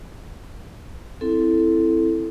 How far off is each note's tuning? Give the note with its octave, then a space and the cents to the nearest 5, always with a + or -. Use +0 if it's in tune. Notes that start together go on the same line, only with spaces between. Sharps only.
C4 -5 E4 +0 A4 +0